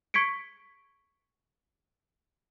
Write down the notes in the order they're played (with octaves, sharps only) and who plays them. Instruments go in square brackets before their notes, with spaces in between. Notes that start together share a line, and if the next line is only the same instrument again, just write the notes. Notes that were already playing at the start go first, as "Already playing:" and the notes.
[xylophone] C#6 G#6 B6 C#7 D7